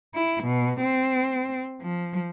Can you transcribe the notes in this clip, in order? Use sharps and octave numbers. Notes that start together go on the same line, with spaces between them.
E4
B2
C4
F3